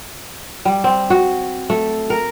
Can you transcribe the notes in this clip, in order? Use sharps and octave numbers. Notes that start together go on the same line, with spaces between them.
G3
C4
F#4
A3
A#4